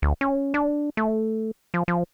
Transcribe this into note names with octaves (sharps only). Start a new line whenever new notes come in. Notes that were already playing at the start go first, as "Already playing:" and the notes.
D2
C#4
D4
A3
F3
F3